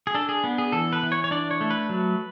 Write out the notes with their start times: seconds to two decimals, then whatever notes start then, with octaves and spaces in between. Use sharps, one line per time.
0.07 G#4
0.14 D4 A4
0.29 G#4
0.44 B3
0.58 G#4
0.72 E3 A4
0.93 B4
1.03 E3
1.12 C#5
1.24 C#5
1.31 D4 D5
1.51 C#5
1.61 A3
1.70 B4
1.89 F#3